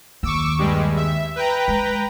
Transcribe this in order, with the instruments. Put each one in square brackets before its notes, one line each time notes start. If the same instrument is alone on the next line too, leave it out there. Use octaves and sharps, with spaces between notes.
[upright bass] D#2 [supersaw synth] C#6 D6 E6
[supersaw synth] G2 G3 G#3
E5
B4 G5 A#5
[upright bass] G#3